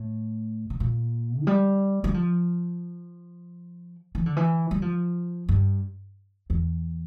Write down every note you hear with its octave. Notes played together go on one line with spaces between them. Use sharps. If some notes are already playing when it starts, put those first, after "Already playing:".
Already playing: A2
C3
A#2
F3
G3
G3
F3
E3
D3
E3
G3
F3
G2
E2